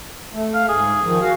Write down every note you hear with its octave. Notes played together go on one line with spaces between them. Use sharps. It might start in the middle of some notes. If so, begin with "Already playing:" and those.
A3
F5
G#2 G#4
D#3 F3
F#4 F5